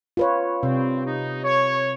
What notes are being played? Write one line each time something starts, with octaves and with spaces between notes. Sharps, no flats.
F4 B4 C#5
G2 C3 C4
D#4
C#5